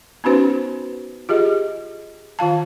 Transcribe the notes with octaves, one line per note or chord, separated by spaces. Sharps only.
B3 C#4 D#4 F#4 B4 C5
F4 G4 G#4 D#5
D#3 F4 F5 A5